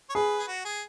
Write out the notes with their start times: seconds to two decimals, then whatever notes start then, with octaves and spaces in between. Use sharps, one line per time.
0.10 C#5
0.15 G#4 B4
0.39 G#4
0.48 F#4
0.65 G#4